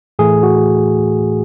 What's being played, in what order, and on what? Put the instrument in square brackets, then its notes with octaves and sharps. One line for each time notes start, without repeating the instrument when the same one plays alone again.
[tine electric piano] A2 E3 A3 G#4
F#4